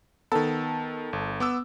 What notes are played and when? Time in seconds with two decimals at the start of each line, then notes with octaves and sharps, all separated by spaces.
0.32 D#3 B3 A4
1.13 G1
1.40 B3 D6 E6